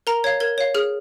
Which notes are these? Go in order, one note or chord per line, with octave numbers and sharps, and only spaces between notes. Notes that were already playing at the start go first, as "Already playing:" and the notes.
A#4 A#5
C#5 F5 G#6
A#4 G#6
C#5 F5
G#4 F6